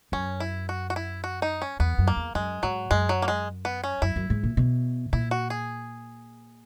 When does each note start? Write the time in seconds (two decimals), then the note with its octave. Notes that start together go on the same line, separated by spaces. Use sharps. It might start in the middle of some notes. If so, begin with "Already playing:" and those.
0.12 F#2 C#4
0.40 E4
0.69 F#4
0.90 F#4
0.96 E4
1.24 F#4
1.42 D#4
1.62 C#4
1.80 E2 B3
1.98 F#2
2.07 A#3
2.17 E2
2.35 F#2 G#3
2.63 G#2 F#3
2.91 F#2 G#3
3.09 F#3
3.22 A#3
3.28 G#3
3.65 B3
3.84 C#4
4.02 F#2 E4
4.16 F#2
4.30 G#2
4.43 A#2
4.57 B2
5.13 A#2 E4
5.31 F#4
5.50 G#4